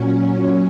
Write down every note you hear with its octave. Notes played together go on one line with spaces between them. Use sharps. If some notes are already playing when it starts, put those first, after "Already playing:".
Already playing: A#2 F#3 C#4